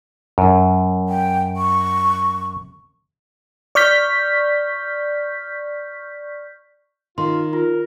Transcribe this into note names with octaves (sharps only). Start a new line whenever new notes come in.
F#2
G5
C#6
D5 C#6 F6 G6 B6
D#3 F4 C6
F4 A#4